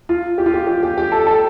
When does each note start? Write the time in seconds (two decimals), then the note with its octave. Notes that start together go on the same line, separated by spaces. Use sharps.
0.09 F4
0.38 G4
0.46 F4
0.54 G4
0.67 G4
0.83 G4
0.98 G4
1.12 A4
1.27 A4